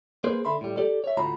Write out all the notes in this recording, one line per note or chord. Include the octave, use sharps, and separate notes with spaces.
A#3 G#4 B4 C5
D3 E5 B5 C6
A2 G3
G4 A4 D5
C#5 E5
D2 A2 F4 F#4 A#5 B5